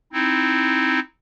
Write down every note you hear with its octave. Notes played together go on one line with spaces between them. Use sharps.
C4 D#4 E4